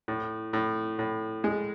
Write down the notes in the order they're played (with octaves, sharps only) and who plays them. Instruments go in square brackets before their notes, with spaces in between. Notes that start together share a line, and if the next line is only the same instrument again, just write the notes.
[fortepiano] A2
A2
A2
G#3